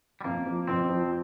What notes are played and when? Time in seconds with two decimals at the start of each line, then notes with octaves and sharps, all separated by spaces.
0.21 G3
0.24 F2 A#3
0.46 F3
0.67 F2 C4
0.89 F3